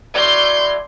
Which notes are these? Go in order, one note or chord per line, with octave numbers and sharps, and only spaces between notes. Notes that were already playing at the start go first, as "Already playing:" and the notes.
A2 F#3 D5 C6 G6